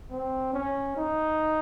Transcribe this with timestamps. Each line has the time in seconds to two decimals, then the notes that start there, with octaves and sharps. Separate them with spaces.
0.11 C4
0.53 C#4
0.97 D#4